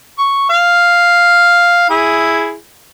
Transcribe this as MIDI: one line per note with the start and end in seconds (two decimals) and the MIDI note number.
0.18 0.47 85
0.50 1.85 77
1.90 2.55 64
1.90 2.55 68